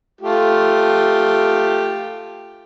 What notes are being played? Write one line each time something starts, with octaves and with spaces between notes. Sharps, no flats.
A3 F4 G4